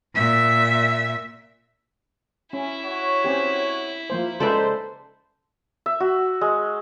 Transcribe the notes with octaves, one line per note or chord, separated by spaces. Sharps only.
A#2 E5
C#4 E4
F#4 C#5
C4 C#4 G4
F3 A#3 C5
C#3 G#3 D#4 A4 B4 C5 D5 E5
E5
F#4
G#3